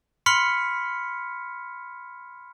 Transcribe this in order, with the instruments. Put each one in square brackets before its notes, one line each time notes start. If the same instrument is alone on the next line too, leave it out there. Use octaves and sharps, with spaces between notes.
[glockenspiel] B5 C6 F6 B6 C#7